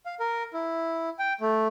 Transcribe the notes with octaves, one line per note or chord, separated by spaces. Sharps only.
F5
A#4
E4
G5
A3